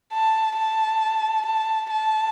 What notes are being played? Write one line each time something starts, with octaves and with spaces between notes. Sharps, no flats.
A5
A5
A5
A5